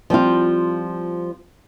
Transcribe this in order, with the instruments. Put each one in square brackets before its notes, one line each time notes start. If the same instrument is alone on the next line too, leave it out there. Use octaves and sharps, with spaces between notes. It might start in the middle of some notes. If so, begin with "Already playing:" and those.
[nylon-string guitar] F3 G3 C4 F4